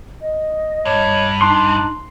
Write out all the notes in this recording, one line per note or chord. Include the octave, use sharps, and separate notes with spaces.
D#5
G2 C#5
D4 D#4 C6